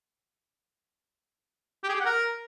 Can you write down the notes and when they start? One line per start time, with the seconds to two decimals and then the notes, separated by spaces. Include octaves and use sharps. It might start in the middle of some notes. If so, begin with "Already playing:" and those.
1.84 G4
1.89 G#4
1.94 G4
2.00 F#5
2.05 A#4